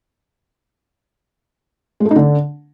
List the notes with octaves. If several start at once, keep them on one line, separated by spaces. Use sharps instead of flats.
G#3
A3
D#4
D3